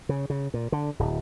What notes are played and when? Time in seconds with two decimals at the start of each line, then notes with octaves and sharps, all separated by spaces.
0.09 C#3
0.30 C#3
0.54 A#2
0.72 D3
0.99 D1